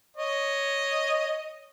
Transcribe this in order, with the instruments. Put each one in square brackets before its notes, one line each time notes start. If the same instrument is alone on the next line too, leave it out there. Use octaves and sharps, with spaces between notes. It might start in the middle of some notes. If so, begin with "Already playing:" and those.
[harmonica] C#5 D#5